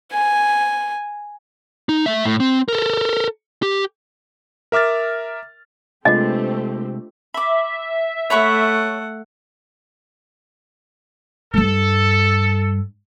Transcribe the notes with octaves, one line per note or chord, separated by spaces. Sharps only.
G#5
D#4
A3 E5
A2
C4
A4 A#4
G4
A#4 E5 D6 F6 A6
C3 G#3 A3 C4 D4 F4 G4 D#5
E5 B5 D6
A3 C#5 F#5 B5 C#6
G2 G3 A4